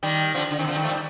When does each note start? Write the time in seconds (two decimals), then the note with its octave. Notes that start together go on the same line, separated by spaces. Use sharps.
0.03 D#3 G3
0.34 D3 F3
0.51 D3
0.59 C3 D#3
0.67 D3 F3
0.75 D#3 G3
0.83 F3 A3
0.91 D#3 G3